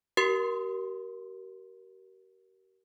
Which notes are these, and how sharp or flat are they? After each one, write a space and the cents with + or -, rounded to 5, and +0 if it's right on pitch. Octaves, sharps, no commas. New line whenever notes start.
G4 -45 A#4 +15 C6 +0